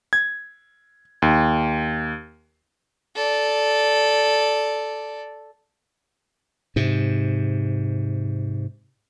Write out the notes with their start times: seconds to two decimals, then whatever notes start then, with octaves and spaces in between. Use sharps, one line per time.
0.13 G#6
1.22 D#2
3.16 A4 D5
6.76 G#2 C3